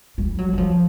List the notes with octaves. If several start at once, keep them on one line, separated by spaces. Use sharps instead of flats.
G3
F#3
F#3
F3